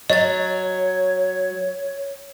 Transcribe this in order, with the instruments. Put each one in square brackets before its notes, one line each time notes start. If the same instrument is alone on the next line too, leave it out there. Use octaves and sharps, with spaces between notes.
[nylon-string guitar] F#3 [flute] C#5 [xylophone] D#5 A6